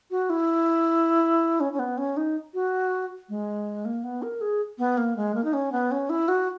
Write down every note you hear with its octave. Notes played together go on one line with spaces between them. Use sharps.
F#4
E4
C#4
C#4
B3
C#4
D#4
F#4
G#3
A#3
B3
A#4
G#4
B3
A#3
G#3
A#3
D#4
C#4
B3
C#4
E4
F#4